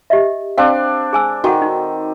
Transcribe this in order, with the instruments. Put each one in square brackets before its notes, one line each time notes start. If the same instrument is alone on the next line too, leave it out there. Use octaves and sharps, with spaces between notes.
[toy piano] G4 D#5 E5
[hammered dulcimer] C4 D4 [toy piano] F5
[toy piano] G#4 G#5 E6
[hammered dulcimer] D#3 [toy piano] F#4 A4 F#5
[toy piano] D#4